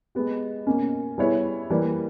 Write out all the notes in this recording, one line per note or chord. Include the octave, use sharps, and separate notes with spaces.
G#3 B3 G4
B2 A#3 C#4
G3 B3 E4 G#4 C#5
E3 G3 A#3